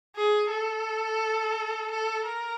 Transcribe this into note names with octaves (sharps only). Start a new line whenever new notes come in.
G#4
A4
A4
A#4